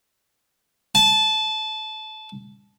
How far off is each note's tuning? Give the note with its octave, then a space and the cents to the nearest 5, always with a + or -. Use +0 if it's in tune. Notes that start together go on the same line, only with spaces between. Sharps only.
A5 -20